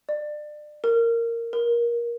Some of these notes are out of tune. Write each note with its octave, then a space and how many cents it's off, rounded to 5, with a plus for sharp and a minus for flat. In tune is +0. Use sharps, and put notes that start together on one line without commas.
D5 +30
A#4 -10
A#4 +20